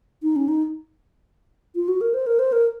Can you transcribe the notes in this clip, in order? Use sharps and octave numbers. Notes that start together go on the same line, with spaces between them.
D#4
C#4
D#4
F4
F#4
A#4
C5
A#4
C5
A#4